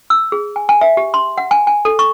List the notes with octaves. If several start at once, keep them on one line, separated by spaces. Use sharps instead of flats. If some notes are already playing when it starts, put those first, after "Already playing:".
E6
G#4
G#5
G#5
E5
G4
C6
F#5
G#5
G#5
A4
C#6